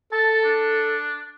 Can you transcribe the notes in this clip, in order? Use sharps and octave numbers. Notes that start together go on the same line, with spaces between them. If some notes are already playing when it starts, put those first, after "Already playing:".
A4 A5
D4